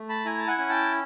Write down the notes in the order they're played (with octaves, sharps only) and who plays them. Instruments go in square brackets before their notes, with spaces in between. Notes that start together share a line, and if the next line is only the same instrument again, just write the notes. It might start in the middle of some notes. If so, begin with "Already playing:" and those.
Already playing: [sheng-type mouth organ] A3
A5 B5
E4 G#5 A#5
A5
F#5 G#5
C#4
G5 A5